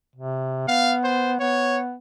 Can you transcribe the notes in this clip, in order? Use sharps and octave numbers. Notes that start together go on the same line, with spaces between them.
C3
B3 F5
C5
B3 C#5